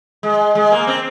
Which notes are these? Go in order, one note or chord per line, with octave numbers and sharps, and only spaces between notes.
G#3
G#3
A#3
C4